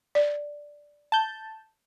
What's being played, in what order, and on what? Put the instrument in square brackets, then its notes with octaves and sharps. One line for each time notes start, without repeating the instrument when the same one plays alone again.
[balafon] D5
[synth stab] A5 G6